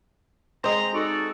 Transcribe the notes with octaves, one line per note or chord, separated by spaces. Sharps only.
G#3 C4 C5 D#5 A#5
D#4 F#4 A4 D5